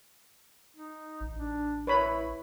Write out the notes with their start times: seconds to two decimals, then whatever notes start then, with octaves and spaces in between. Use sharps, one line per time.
0.76 D#4
1.20 A1
1.38 D4
1.87 E4 B4 C#5 B5